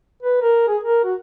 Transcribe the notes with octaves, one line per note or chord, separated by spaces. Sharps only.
B4
A#4
G#4
A#4
F#4